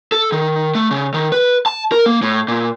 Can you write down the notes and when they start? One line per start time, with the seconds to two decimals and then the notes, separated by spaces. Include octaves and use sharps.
0.12 A4
0.32 D#3
0.75 A3
0.91 C#3
1.14 D#3
1.32 B4
1.66 A5
1.92 A#4
2.06 A#3
2.22 A2
2.48 A#2